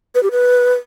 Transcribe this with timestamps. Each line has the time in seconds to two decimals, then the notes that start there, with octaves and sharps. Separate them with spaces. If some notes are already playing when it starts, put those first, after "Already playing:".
0.15 B4
0.23 G4
0.31 B4